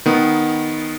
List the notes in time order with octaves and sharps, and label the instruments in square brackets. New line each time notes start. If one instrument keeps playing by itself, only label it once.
[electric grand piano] D#3 B3